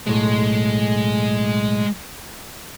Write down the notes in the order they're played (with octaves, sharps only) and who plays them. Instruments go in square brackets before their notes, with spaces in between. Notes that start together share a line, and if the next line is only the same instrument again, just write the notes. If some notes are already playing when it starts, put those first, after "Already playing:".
[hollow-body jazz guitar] B1 A2 [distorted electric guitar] G#3